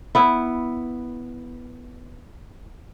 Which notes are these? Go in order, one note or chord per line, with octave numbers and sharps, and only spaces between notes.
B3 E4